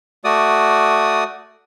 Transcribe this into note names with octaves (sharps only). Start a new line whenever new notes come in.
A3 F#4 D5 D#6